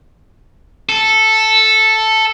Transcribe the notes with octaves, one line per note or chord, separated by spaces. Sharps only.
A4